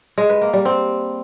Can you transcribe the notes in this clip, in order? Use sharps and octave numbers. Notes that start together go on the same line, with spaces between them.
G#3
B4
A#3
G3
C4